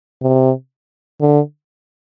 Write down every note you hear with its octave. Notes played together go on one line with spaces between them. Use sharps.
C3
D3